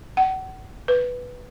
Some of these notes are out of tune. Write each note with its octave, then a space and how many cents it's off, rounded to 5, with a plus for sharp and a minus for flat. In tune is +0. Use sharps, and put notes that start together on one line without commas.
F#5 +35
B4 +0